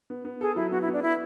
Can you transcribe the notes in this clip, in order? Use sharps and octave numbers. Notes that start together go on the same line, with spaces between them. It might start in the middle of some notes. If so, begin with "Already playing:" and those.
B3
B3
G#4 A4
F#3 E4
B3 F#4
E4
B3
D4
B3 E4